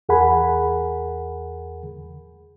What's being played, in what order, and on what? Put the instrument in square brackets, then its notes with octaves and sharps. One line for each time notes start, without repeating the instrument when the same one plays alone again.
[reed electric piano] E2 G#4 A#4 F#5 G#5 B5